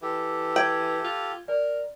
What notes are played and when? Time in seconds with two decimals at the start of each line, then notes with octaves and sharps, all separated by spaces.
0.02 E3 G4 A4
0.56 G5 G#6 F#7
1.04 F4
1.48 A#4 D5